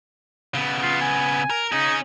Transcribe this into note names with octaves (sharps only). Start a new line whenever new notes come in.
C#3 B3
F4
G#5
A#4
C#4 D#4 G#4